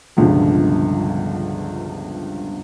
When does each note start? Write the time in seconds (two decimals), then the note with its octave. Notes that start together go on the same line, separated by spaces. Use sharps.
0.17 G1 C#2 G2 B2 D3 F3